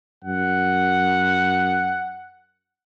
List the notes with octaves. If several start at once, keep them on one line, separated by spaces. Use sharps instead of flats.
F#2 F#5